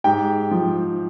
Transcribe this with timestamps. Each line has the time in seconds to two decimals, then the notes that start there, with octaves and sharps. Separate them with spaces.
0.04 G#2 G4 G5
0.51 F3